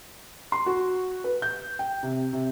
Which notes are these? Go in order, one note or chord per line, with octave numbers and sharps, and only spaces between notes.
C6
F#4
B4
G6
G5
C3
C3